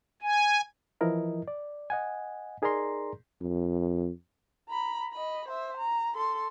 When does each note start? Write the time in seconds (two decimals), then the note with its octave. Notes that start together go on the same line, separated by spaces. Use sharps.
0.22 G#5
1.01 E3 F3 E4 A#4 D#5
1.48 D5
1.90 D#5 F#5 G#5
2.62 D#4 G#4 A#4 D5 A#5 C6
3.42 F2
4.69 A#5 B5
5.12 D#5 B5
5.48 C5 E5
5.78 A#5
6.15 A4 C6